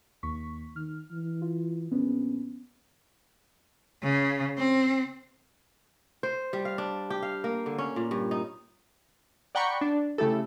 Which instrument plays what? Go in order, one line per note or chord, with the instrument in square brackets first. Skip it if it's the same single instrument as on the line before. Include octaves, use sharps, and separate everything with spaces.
[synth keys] D#2 C#6 B6
[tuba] D#3 [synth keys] F6
[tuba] E3
[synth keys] F4
[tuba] A#1 [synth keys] B3 C#4
[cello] C#3
C4
[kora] C5
G3
F5
D4
G4
F5
A#3
D3
C#4
A#2
G2
D#4
[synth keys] D5 F#5 G5 A#5 B5 C#6
D4
C#3 A3 E4 G4 A4